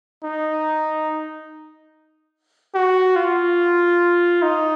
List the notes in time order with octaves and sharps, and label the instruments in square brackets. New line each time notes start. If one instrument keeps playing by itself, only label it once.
[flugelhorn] D#4
F#4
F4
D#4